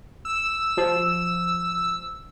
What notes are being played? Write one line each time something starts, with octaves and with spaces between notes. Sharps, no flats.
E6
F3